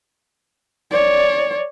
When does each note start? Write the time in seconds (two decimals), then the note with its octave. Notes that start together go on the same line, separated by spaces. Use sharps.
0.91 C#5 D5